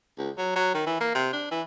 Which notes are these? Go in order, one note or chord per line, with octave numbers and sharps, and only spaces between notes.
C#2
F#3
F#3
D#3
E3
A#3
C3
D4
E3